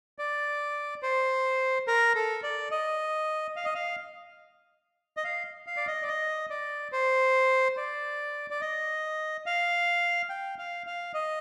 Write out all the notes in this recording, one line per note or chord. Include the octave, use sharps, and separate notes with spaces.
D5
C5
A#4
A4
D5
D#5
F5
D#5
F5
D#5
F5
F5
D5
D#5
D5
D#5
D5
C5
D5
D5
D#5
F5
G5
F5
F5
D#5